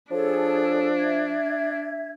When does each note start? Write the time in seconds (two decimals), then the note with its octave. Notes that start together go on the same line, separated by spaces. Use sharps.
0.12 F3 D4 G#4 A4 C#5
0.97 E5 G#6